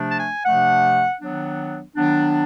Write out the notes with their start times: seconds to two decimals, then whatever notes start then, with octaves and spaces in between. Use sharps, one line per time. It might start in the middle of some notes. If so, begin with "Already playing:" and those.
Already playing: C3 F3 A3 D4
0.11 A5
0.19 G#5
0.45 C3 F3 A3 D4 F#5
1.21 D#3 F#3 B3 D4
1.96 D#3 F#3 B3 D4